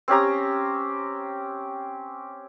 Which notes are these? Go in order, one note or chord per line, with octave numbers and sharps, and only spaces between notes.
C4 C#4 G4 A#5